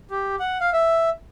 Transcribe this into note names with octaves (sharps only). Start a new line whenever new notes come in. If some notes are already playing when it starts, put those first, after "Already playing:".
G4
F#5
F5
E5